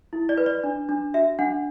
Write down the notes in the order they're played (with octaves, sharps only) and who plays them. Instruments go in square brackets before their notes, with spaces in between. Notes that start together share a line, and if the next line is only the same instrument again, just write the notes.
[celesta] E4
D5
B4
D5
D4
D4
F#4 E5
D4 F#5